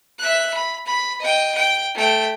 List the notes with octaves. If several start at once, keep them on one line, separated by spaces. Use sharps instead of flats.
E5 F#6
B5
B5
D#5 G5
G5
A3 G5